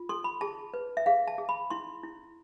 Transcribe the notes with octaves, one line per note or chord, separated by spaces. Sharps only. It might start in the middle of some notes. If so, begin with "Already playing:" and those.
Already playing: F4
A4 C6
B5
G#4 A5
B4
E5
G#4 F5
A5
G#4
B5
E4 C6
E4